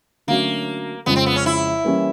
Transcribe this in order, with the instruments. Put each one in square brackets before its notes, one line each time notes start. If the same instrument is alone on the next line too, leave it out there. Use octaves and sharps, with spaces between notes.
[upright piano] D3 F#3 A3 C#4 F#4 [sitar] A#3
[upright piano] F2 C#3 F3 G#3 [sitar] B3
[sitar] C4
B3
C#4
E4
[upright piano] E3 G3 A#3 C#4